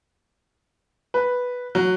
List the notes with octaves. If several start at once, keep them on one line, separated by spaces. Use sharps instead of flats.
B4
F#3